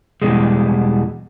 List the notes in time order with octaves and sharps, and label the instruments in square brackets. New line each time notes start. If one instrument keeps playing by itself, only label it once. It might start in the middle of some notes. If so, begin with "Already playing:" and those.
[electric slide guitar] E2 B2 E3 G3 G#3